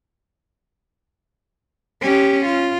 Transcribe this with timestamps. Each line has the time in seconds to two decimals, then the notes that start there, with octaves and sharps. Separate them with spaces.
2.02 C#4 G4
2.46 F4